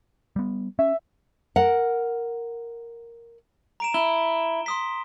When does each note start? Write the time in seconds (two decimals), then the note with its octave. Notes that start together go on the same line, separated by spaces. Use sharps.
0.36 G3 B3
0.79 C#4 E5
1.56 A#4 F#5
3.80 A#5 D7 E7
3.94 E4 G7
4.66 C6 D#6 B6